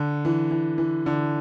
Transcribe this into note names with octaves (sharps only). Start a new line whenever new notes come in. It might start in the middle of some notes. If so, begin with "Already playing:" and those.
Already playing: D3
E3
E3
E3
D3